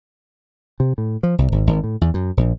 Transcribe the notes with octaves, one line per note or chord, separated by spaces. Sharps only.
C3
A2
F3
C2
G#1
G#1
A2
E2
F#2
A#1